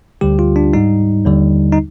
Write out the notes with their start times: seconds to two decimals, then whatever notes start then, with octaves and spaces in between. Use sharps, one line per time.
0.21 D2 D3 G3 G4
0.39 F4
0.56 D4
0.73 G#2 G3 D#4
1.25 D#2 D3 G3
1.72 D#4